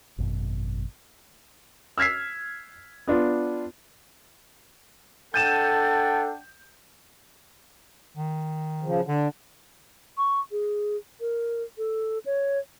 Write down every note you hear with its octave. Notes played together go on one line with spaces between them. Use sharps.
G#1 F#2 B2
E6 F6 G#6 B6 C7
B3 D4 F4
D4 A4 F#5 G5 G6 A6 D#7 E7
D#3
C#3 F3
D3 D4
C#6
G#4
A#4
A4
C#5